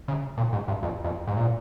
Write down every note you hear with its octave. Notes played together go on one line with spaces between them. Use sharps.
C#3
A#2
G#2
G2
F2
F2
G#2
A#2